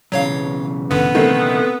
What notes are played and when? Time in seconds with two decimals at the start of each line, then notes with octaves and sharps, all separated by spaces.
0.12 B1 C#3 E3 F#3 C#5 F5
0.91 A1 G2 D3 B3
1.15 D#3 A3 C4